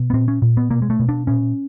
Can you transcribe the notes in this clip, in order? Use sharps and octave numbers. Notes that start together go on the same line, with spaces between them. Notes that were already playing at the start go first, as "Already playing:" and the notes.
Already playing: B2
B3
A#2 C4
C#4
A#2
B3
B2 A#3
G#3
A3
B2
D4
A#2 C#4